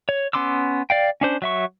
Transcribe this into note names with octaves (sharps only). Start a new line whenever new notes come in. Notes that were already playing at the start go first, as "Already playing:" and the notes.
C#5
B3 C#4 C6 D6 E6
D5 F5 G5
C#4 D4 C5
F#3 E5 C#6